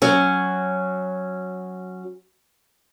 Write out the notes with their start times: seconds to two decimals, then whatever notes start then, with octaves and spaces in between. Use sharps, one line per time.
0.02 F#3 C#4